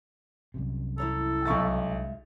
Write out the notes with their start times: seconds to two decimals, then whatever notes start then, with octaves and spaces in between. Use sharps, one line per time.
0.54 C2 F#2 C3
0.98 E4 A4 C#5 A#5
1.46 B1 G#3 E5 F5 C#6 A6